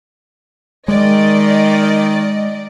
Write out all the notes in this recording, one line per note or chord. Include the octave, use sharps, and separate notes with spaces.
D#3 G#3 D5 D#5